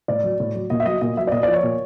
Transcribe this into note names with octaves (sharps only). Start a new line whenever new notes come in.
A2 D5
F#3
A2
F#3
A#2 D#5
E5
F#3 D#5
A#2 D#5
F#3 E5
D5
A#2 D#5
D5
F3
C#5
A#2